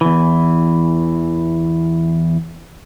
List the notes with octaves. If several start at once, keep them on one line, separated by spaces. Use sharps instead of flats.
E2 E3